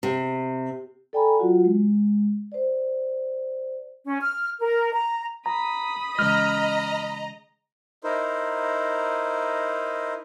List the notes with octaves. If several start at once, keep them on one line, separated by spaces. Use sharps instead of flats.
C3
A4 D5 G5 G#5 A#5 B5
F#3 F4 F#4 F#5
G#3
C5 D5
C#4
F6
A#4
A#5
A#5 B5 D#6
C#3 E3 G#3 D#5 A#5 F6
D#4 E4 A#4 C5